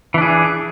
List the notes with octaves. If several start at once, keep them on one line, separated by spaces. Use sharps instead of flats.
E3 D4 G#4